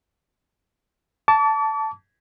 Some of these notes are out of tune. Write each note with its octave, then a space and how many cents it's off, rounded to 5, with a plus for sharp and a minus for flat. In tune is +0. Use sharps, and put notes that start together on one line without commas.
A5 +0 D6 -40